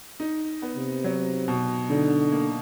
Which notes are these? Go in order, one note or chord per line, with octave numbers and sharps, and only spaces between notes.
D#4
B3
C3
F#3
B2
D3 D#4
A#3